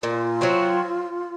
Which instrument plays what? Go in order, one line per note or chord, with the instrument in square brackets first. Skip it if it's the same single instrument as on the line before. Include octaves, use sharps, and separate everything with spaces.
[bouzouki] A#2 [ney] F4
[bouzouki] F#3 C4 F#4